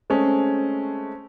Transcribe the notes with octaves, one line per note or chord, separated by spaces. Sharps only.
G#3 A3 C4 C#4